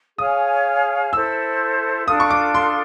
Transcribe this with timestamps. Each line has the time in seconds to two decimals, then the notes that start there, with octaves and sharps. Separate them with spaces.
0.18 G#4 C#5 F5 G#5 D#6
1.13 E4 A4 C5 E6
2.08 D4 F4 A4 D#6
2.20 C#6
2.31 D6
2.54 C6